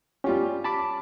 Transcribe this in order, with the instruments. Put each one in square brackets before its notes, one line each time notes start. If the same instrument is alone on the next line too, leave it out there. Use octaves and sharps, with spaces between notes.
[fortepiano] G3 F4 G4 [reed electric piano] C#4
[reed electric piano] A5 B5 D6